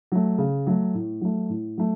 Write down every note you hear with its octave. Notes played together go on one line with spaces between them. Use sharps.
F#3 A3
C#3
F#3 A3
A2
F#3 A3
A2
F#3 A3